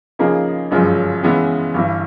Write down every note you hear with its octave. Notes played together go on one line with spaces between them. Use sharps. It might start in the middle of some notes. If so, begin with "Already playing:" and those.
C#3 F3 A#3 D#4 G#4
G1 F#2 C#3 F3 G#3
C#3 E3 G#3 B3
G1 G2 E3